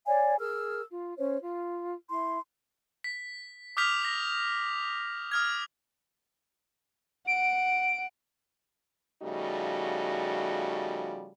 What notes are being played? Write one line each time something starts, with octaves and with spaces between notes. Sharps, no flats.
C#5 D5 F5 G#5
G#4 A#4 E6 F6
F4
C#4 C5 C#5
F4
E4 C6
B6
D6 D#6 F6 G6 B6 F7
A#6
D#6 F6 G#6
F#5 D7
C#3 F3 G3 A3 D#4 F#4